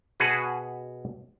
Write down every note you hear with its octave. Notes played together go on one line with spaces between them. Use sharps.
B2 F#4 G#4 B4